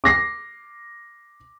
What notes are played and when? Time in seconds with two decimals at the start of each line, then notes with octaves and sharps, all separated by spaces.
0.04 D6 A#6 C7